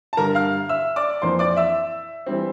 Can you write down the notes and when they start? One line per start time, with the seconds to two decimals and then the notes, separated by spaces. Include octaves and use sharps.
0.13 A5
0.17 G2 D3 G3 A#4 A#5
0.35 F5 F6
0.69 E5 E6
0.96 D5 D6
1.22 F2 E3 A#3 C5 C6
1.39 D5 D6
1.56 E5 E6
2.26 E3 G3 C4